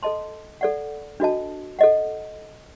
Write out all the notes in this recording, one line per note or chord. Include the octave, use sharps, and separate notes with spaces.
A4 D#5 A5 C6
A4 D5 F#5
D4 F#4 A4 D#5 A5
A4 D#5 F#5